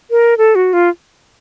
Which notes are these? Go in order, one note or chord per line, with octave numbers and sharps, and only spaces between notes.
A#4
A4
F#4
F4